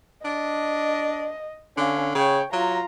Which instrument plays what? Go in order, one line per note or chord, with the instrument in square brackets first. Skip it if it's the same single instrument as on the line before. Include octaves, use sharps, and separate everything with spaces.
[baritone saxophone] D4 [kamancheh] D#5
[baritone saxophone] D3 [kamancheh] C#4 F5
[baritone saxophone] C#3 [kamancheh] C#5 G5
[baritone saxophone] F#3 [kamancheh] F4 A#5